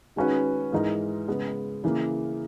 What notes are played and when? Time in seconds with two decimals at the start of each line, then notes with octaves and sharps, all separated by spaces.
0.16 D#3 G#3 C#4 F#4 B4
0.72 G#2 E3 G#3 D#4 A#4
1.28 C#3 G#3 B3
1.84 C#3 E3 A#3